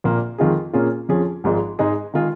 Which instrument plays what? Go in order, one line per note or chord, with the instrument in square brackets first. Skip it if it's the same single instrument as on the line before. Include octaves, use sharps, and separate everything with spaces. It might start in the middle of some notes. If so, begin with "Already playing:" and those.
[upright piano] A#1 A#2 A#3
F2 D#3 G#3 F4 G#4
A#2 A#3 C#4 F4 G#4
F2 F3 C#4 G#4
G#1 G#2 F3 G#3
G#2 G#3 D#4 G#4
D#3 G#3 F4 G#4